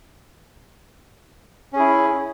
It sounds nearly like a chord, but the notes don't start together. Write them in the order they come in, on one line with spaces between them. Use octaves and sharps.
C#4 G#4 E4